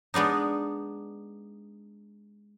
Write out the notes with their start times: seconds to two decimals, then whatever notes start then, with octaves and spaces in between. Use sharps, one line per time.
0.14 G#3 B3 D4 D#4